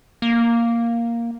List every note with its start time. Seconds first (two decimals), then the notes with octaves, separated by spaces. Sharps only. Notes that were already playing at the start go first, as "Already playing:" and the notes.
0.22 A#3